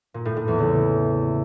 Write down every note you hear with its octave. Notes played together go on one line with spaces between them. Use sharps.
A#2
A2
A2
E2
C#3